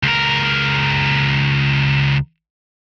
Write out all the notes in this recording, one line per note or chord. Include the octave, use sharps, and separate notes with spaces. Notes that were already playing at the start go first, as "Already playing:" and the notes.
C#2 A#4